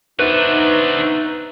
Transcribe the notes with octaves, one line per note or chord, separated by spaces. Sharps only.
B3 D4 D#4 F#4 B4 C5 E5